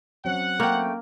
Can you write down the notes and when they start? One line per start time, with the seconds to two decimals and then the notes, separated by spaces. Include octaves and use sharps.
0.25 F#3 C4 C#4 F#5
0.60 A3 A#3 G5